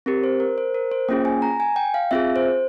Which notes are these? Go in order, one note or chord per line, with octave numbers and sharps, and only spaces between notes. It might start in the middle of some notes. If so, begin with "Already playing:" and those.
C4 G4 A#4
C5
A#4
C5
A#4
C5
A#3 C#4 F4 G#4 G5
G#5
A#5
G#5
G5
F5
C4 F4 G#4 E5
C5